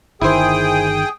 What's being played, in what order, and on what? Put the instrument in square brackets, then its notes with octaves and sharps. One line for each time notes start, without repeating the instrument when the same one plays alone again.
[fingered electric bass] G1 D#3 [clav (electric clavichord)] E4 C5 [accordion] G#4 G5 D#6